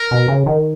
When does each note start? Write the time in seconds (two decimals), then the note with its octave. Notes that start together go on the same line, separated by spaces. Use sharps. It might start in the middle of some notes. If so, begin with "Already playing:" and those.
Already playing: A#4
0.11 B2
0.28 C#3
0.46 D#3